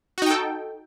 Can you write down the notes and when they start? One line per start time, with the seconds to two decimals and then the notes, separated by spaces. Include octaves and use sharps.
0.18 F#4
0.22 D#4
0.26 G5
0.30 A4